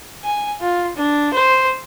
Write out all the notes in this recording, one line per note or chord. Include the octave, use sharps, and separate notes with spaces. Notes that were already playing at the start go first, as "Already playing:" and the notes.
G#5
F4
D4
C5